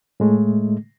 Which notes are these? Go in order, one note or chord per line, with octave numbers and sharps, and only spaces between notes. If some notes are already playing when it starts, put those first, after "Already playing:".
A2 G#3 A3